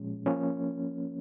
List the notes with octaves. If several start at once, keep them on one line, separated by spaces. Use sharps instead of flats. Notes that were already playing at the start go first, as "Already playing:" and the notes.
Already playing: A#2 F3 G#3 C#4
F3 A#3 C#4